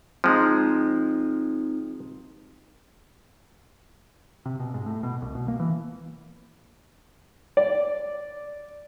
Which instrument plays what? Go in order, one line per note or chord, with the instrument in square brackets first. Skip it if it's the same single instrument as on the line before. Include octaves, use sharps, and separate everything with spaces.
[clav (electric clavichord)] F3 G#3 [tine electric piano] C4 D#4
[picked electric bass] C3
B2
G#2
A2
B2
C2
B2
A#3
E3
[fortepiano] D5